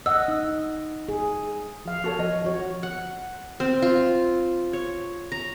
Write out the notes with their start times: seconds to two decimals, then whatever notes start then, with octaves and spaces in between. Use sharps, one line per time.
0.06 D#5 F#5 E6
0.28 D#4
1.09 G#4
1.85 F3 F5
2.04 F#4 A4 C#5
2.19 F3 D#5
2.44 F3 F#4 C#5
2.83 F#5
3.60 C4
3.82 F4
4.73 C#5
5.32 A#5